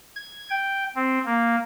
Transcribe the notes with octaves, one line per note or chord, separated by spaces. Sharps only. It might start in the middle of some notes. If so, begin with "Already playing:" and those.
G#6
G5
C4
A#3